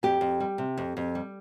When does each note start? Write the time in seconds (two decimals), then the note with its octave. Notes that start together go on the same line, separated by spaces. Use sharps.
0.03 F2 G4
0.21 F2
0.40 G3
0.58 C3
0.77 F2
0.97 F2
1.15 G3